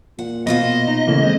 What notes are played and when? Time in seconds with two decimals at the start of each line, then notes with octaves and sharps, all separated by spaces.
0.19 A#2 F#5
0.47 B2 F4 C5 D#5
0.88 D#4
1.07 A2 C#3 E3 A#3
1.23 G#3 C4